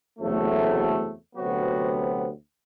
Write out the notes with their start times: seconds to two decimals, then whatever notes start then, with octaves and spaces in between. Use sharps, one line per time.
0.19 F#1 E2 C3 F#3 A3
1.36 D2 C3 F#3 B3 F#4